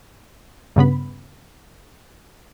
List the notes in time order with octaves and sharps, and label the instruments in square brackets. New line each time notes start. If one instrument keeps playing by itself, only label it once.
[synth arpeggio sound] G2 C#3 B3 B5